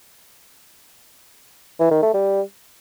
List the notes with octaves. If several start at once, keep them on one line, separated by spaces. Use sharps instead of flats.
E3
D#3
A3
G3